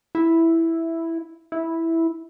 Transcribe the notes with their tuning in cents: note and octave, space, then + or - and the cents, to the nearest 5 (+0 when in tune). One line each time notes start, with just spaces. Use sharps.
E4 +0
E4 -5